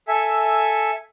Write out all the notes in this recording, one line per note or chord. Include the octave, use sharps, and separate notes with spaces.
A4 E5 G#5